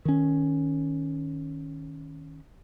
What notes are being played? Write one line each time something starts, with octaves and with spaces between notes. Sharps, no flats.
D#3 C#4